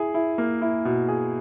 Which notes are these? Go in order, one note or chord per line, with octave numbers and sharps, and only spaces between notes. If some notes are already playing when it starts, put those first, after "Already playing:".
Already playing: E4 G#4
E4
A#3
E4
B2
G#4